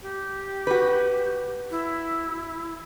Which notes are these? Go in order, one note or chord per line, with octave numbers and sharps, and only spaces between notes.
G4
F#4 B4
E4